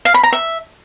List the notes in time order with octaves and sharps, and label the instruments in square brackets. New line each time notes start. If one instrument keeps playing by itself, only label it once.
[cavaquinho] F5
B5
A#5
E5